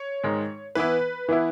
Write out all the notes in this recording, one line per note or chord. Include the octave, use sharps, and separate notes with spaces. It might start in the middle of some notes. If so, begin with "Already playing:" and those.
Already playing: C#5
G#2 D#3 G#3 D#4
E3 B3 E4 B4
E3 B3 E4